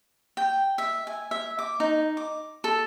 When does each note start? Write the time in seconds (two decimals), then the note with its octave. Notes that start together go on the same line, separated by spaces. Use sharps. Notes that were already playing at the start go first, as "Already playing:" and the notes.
0.37 G5
0.78 E5
1.07 G#5
1.31 E5
1.59 D6
1.80 D#4
2.17 D6
2.64 A4